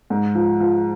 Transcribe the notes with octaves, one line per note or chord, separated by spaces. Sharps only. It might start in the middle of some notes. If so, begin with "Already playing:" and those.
G#2
F3
F3